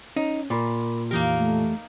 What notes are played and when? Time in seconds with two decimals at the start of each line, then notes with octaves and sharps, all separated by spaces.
0.16 C#4 D#4
0.50 A#2 A#4 B5 D6
1.11 F2 E3 A#3 D#4 G4 A#4
1.37 A3